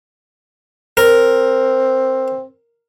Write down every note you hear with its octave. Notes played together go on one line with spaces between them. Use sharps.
C4 A#4